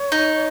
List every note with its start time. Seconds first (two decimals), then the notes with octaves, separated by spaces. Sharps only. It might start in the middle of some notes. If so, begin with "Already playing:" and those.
Already playing: C#5
0.12 D#4